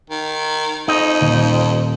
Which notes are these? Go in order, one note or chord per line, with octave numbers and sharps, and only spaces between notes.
D#3
F2 D#4
D#1